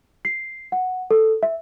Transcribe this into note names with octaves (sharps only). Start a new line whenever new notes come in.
C7
F#5
A4
E5